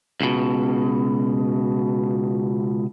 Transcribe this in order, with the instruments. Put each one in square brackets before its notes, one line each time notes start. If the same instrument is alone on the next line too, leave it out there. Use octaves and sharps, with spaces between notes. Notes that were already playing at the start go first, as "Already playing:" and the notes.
[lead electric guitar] C#2 B2